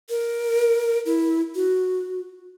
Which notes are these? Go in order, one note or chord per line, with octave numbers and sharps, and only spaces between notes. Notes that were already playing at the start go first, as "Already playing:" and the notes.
A#4
E4
F#4